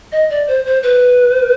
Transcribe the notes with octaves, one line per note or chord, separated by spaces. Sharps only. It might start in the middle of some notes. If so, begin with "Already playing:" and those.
D#5
D5
C5
C5
B4